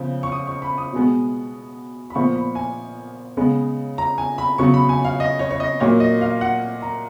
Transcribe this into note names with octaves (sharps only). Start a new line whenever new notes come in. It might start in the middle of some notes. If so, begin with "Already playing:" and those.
Already playing: C#3 F3 B3
C#6
D#6
C#6
B5
D#6
B2 G#3 B3
B5
A#2 F3 B3 C#6
B5
G#5
C#3 G#3 B3
A#5
G#5
B5
C#3 F#3 B3 C#6
B5
G#5
F5
D#5
C#5
C#5
D#5
A#2 F#3 A#3 C#5
D#5
F5
F#5
A#5